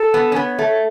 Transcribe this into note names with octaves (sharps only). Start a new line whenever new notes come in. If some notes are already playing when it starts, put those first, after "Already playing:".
Already playing: A4
B3
C#4
B3 C#5
A3